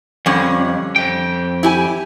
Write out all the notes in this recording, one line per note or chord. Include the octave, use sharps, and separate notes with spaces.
F2 D3 G3 C#4
F2 G5
E4 G4 G#5